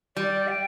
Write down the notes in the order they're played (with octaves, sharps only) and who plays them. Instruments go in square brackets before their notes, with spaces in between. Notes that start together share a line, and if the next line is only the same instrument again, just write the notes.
[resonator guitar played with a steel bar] G3 [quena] D5
[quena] G5